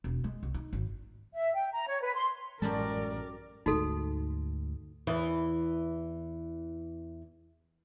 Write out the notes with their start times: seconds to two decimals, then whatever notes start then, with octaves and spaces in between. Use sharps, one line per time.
0.04 E1
0.24 G#3
0.43 C2
0.54 D#4
0.73 G#1
1.34 E5
1.54 G5
1.74 A#5
1.88 C#5
2.01 B4
2.16 C6
2.62 A1 F#2 G3 G#3 A4 A#4 D5
3.66 D2 G#2 D#4 F#4 A4
5.07 E2 E3